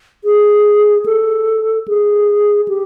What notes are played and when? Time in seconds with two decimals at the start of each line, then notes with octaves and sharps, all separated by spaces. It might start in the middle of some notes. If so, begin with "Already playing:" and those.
0.24 G#4
1.06 A4
1.88 G#4
2.68 G4